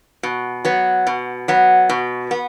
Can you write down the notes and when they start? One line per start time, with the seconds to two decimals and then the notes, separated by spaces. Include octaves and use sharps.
0.23 B2
0.65 F#3 B3
1.07 B2
1.48 F#3 B3
1.90 B2
2.31 B3